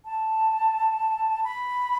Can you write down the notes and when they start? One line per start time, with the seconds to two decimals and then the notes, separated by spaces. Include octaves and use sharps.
0.05 A5
1.44 B5